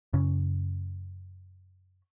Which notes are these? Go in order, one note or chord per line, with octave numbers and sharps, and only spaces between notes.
F#2 C#3 C#4